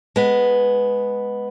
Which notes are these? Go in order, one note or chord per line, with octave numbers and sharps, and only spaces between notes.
G#3 B3